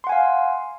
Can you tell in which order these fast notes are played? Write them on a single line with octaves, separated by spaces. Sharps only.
C6 F#5 G#5 F5